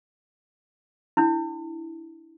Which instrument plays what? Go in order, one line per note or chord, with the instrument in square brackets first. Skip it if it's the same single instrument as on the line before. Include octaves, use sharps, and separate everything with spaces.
[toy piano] D4 E4